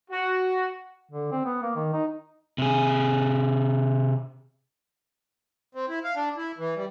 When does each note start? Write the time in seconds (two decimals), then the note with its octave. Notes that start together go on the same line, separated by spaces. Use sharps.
0.11 F#4
1.11 D3
1.32 C4
1.46 B3
1.62 A#3
1.76 D#3
1.93 D#4
2.58 C3 G#4
5.75 C4
5.89 E4
6.04 F5
6.16 D4
6.37 E4
6.58 E3
6.76 G3